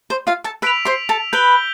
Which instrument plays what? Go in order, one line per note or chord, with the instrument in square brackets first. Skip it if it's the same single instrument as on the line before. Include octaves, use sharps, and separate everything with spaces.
[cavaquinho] C5
F4 F5
A4 A5
[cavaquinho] B4 B5 [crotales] E6 B6 D7 F7
[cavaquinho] C5 C6
A4 A5
[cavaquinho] B4 B5 [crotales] G6 D7 G7